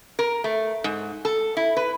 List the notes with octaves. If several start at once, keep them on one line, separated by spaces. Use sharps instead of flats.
A#4
A3
G#2
A4
E4
B4